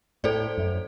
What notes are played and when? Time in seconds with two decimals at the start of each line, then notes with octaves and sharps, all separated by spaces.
0.24 A2 A4 C5 D5
0.57 F#2